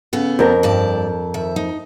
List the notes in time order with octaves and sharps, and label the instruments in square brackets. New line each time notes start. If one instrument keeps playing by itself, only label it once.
[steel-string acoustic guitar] C#3 B3 A4
[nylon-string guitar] F2 A#4
[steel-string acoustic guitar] G2 D5 A5
D#3 E5
D#4